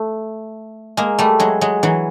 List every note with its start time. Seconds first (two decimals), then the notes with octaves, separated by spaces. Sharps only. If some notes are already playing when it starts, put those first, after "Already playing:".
Already playing: A3
0.97 G#3 A#3
1.19 G3 A3
1.40 F#3 G#3
1.61 F#3 G#3
1.83 E3 F#3